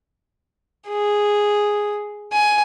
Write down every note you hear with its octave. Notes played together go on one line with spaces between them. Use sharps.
G#4
G#5